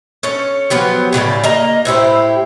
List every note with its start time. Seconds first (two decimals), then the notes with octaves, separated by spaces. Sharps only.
0.23 C#4 A4 C#5
0.70 F3 F#3 B3 G4
1.13 A2 C#3 G4 D5
1.44 A#3 D#5 A#5
1.85 A2 E4 G4 C5